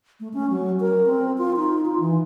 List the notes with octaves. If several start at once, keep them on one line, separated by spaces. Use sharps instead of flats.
A3
C#4
F#3
A#4
C4
F4
D#4
F4
E3